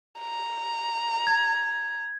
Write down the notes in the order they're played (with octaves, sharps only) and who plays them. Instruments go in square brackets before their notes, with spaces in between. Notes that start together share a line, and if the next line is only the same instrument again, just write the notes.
[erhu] A#5
[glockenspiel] G#6